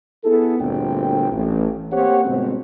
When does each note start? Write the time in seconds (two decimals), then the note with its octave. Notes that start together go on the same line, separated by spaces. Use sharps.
0.24 B3 E4 G#4 A4
0.60 G1 D2 A#2 D3 C4 G5
1.32 A1
1.92 A#3 C4 G4 C5 C#5 F#5
2.25 G1 B2 G#3 C4